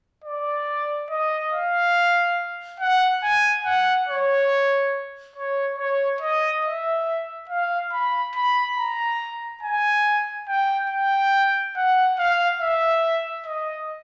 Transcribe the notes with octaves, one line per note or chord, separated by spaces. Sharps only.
D5
D#5
F5
F#5
G#5
F#5
C#5
C#5
C#5
D#5
E5
F5
B5
B5
A#5
G#5
G5
G5
F#5
F5
E5
D#5